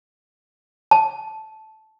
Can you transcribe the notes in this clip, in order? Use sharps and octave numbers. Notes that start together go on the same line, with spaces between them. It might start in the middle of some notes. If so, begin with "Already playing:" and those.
A5